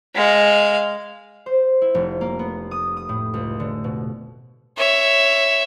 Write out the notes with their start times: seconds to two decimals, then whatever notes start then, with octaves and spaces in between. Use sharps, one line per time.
0.15 G#3 F5
1.46 C5
1.82 E4
1.95 F1
2.21 A#3
2.39 B3
2.71 D#6
2.97 D#6
3.09 A2
3.34 C#2
3.60 D3
3.84 B2
4.77 C#5 E5